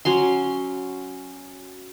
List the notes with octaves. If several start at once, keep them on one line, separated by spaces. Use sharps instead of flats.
F#3 C#4 C6